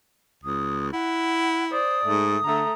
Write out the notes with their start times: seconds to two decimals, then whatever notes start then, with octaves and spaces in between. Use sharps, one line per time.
0.44 C#2 D#6
0.93 E4 F#5
1.71 C5 D5 D#6
2.05 G#2 A3
2.43 D3 A3 A#5